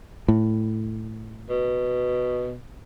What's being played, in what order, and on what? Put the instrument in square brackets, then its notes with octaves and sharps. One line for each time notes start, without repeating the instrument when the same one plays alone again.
[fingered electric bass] A2
[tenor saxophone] B2